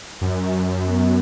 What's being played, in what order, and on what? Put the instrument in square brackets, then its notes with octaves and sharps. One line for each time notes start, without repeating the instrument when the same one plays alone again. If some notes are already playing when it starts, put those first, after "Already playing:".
[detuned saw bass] F#2
[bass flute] B3